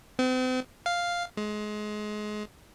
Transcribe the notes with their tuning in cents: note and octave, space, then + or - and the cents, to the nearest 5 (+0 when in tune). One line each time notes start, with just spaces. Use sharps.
C4 -40
F5 +0
G#3 +25